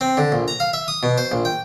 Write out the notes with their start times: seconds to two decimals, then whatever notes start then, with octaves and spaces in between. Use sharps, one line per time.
0.01 C4
0.17 D3
0.32 A#1
0.48 A#5
0.60 F5
0.73 E5
0.88 D#6
1.03 B2
1.18 C5
1.32 A#1
1.45 G5